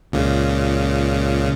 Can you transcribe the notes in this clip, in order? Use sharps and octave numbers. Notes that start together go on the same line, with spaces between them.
C#2 A#2 C#3